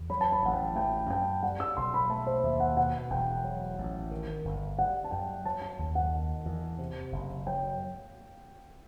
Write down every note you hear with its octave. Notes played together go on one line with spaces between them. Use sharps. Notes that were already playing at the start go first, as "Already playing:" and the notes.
Already playing: E2
F#3 B5
A5
B5
A1 F#5
G5
A3 G5
F#2 G5
G3 F#5
E6
B1 C6
B5
A3 A5
C5
D#2 E5
F#5
B2 F#5
E1 G5
F#3
A1
D#3
G1
G3 F#5
A5
F#2 G5
F#3 A5
A5
D#2
F#5
D#3
E2
C3
F#1
F#3 G5